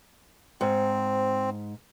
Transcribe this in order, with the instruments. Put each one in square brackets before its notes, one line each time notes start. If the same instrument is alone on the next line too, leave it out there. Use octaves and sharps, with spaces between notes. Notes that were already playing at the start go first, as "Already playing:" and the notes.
[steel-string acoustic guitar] G#2 [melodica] C4